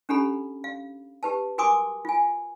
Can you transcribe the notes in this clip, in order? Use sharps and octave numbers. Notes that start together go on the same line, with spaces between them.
C#4 D4 G4 A4 A#5 B5
F5
G4 B4 A5
F#4 A#4 G#5 C6 D6 D#6
F4 G#5